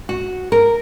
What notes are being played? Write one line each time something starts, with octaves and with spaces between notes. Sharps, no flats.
F#4
A#4